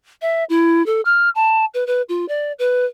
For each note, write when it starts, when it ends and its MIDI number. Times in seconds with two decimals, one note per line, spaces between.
0.22 0.44 76
0.50 0.84 64
0.86 1.01 69
1.05 1.29 89
1.35 1.65 81
1.74 1.86 71
1.87 2.02 71
2.09 2.28 65
2.28 2.53 74
2.59 2.85 71